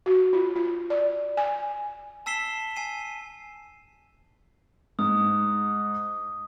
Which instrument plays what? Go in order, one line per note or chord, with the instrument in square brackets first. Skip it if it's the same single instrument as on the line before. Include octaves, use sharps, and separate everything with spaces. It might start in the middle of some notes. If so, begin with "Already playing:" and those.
[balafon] F#4
F4
F4
D5
G#5
[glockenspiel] A5 E6 B6 C7 E7 G7
G#5 C7 D#7
[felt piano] G#2 [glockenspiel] D#6